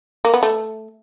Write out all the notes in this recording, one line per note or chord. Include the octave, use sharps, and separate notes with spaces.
A#3
B3
A3